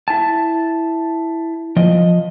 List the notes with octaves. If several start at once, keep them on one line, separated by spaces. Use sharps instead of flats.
E4 A5
F3 D#5